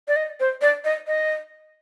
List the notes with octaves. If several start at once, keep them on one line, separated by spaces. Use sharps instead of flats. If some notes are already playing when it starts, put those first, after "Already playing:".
D5
D#5
C5
D5
D#5
D#5